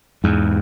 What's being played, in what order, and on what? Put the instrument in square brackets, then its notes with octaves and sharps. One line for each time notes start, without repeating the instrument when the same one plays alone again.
[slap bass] E2 G#2